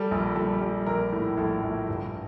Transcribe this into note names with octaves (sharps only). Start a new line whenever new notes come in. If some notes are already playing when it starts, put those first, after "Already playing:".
Already playing: G3 A4
A#1
G3 A4
G3
A#1 A#4
A2
A#1 A4
A#1
G2